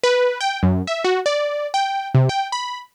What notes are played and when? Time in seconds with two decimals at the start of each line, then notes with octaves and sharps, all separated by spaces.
0.04 B4
0.41 G5
0.63 F#2
0.87 E5
1.04 F#4
1.26 D5
1.74 G5
2.15 C3
2.29 G5
2.52 B5